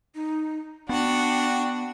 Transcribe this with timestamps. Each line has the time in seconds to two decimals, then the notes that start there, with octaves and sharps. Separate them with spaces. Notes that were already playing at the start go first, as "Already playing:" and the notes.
0.15 D#4
0.89 B3 D4 F#4 F#5 G5